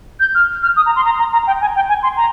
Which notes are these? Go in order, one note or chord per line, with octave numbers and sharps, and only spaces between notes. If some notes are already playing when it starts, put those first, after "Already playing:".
G6
F6
F6
D#6
A#5
C6
A#5
A#5
A#5
G5
G#5
G5
G#5
C6
A#5